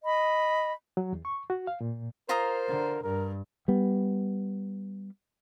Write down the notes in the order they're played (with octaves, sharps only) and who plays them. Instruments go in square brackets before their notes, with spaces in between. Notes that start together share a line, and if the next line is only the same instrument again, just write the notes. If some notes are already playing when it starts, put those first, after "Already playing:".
[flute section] D#5 B5
[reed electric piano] F#3
E2
C#6
F#4
F5
A#2
[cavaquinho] F4 A#5 D#6 [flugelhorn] A#4 [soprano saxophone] C5
[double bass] D3
[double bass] G2 [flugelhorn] A#4
[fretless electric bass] G3 B3